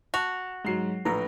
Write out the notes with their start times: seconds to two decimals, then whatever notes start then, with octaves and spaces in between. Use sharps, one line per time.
0.14 F#4 A5 F7
0.65 G#2 F#3 G#3 C7
1.05 A#1 A2 B4 A#5